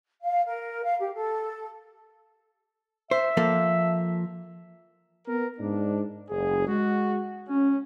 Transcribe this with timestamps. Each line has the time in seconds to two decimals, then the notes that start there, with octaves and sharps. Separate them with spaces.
0.23 F5
0.45 A#4
0.84 F5
0.99 G4
1.14 A4
3.11 C5 E5
3.37 F3 A#3 A4
5.27 B3 A#4
5.59 G#2 D4
6.30 F#1 G#4
6.67 G#3 F#4
7.49 C#4